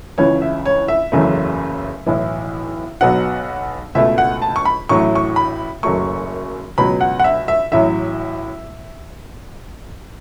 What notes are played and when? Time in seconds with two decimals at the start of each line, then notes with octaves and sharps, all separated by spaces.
0.18 C#2 C#3 E3 C#5
0.42 E5
0.66 C#5
0.88 E5
1.12 F#1 E2 C#3 F#3 A3
2.06 B1 A2 E3
3.01 B1 B2 F#3 F#5
3.95 C#2 B2 A3 E5
4.18 F#5
4.42 A5
4.56 C#6
4.65 B5
4.89 A1 A2 F#3 A3 C#6
5.15 C#6
5.36 B5
5.83 F#1 F#2 F#3 A3 C#6
6.78 C#2 B2 F#3 B5
7.01 F#5
7.20 F#5
7.24 E5
7.48 E5
7.72 A1 A2 F#3 E5